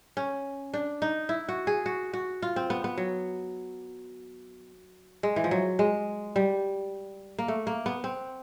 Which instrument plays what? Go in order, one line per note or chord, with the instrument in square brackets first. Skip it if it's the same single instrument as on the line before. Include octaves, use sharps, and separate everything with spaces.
[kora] C#4
D4
D#4
E4
F#4
G#4
F#4
F#4
F4
C4
B3
B3
F#3
G#3
E3
F3
F#3
G#3
G3
A#3
A3
A#3
B3
C4